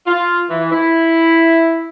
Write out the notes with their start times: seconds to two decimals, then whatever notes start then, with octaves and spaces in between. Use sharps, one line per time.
0.07 F4
0.49 E3
0.72 E4